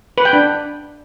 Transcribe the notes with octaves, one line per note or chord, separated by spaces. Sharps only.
B4
G5
D4